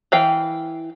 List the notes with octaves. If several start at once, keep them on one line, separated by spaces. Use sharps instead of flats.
E3 F5 G5